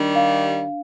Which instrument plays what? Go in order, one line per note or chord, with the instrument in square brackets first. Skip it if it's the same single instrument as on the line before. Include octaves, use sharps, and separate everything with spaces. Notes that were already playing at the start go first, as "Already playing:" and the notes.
Already playing: [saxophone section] D#3 G3 [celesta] D4
[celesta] F5